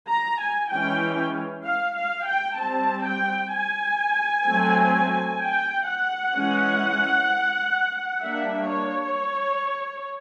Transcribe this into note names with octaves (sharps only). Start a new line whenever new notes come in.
A#5
G#5
E3 G#3 C#4 G5
F5
F5
G5
G3 C4 A5
G5
G#5
F#3 A3 C4
G5
F#5
E3 G#3 C#4
G3 A#3 D4 E5
C#5